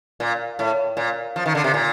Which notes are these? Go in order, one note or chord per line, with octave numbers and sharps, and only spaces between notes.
A#2
A2
A#2
F3
D#3
D3
C3
A#2